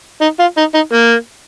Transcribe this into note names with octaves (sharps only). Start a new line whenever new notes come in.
D#4
F4
D#4
D#4
A#3